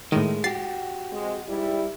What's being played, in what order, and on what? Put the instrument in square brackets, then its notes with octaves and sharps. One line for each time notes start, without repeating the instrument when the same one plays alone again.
[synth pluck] A2 D#3 [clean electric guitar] G#3
[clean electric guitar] F#4 G4 [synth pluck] A6 C7
[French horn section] G#3 C4
G#2 G3 E4